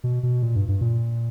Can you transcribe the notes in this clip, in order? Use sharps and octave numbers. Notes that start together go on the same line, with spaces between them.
B2
B2
A#2
G2
G2
A#2